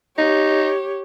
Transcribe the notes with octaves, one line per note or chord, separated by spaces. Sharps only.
D#4 G4 C#5